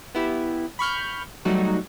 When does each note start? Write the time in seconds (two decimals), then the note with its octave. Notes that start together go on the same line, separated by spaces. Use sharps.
0.14 B3 E4 G4
0.79 B5 C#6 F6 G6
1.45 F#3 G3 A3 D#4 F#4